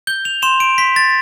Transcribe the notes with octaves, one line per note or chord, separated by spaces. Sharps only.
G6 G7
F7
C6 E7
D7
C6 B6
A6